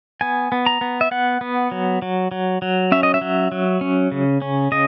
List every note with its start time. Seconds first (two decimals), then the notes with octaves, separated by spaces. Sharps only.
0.21 B3 G#5
0.52 B3
0.66 A#5
0.81 B3
1.01 E5
1.11 B3 F#5
1.41 B3
1.71 F#3
2.02 F#3
2.32 F#3
2.62 F#3
2.92 C#4 E5
3.03 D#5
3.14 E5
3.21 F#3
3.52 F#3
3.81 C#4
4.12 C#3
4.42 C#4
4.72 C#3 D#5